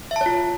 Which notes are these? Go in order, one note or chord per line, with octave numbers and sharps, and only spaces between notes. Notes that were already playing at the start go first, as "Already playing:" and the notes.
F4 C#5 E5 A5